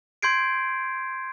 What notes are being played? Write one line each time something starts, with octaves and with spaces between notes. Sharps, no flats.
C6 G6 G#6 C7 D7